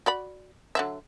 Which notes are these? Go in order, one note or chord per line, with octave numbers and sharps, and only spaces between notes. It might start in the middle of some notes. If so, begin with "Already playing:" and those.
F#4 D5 B5
D3 F#3 E5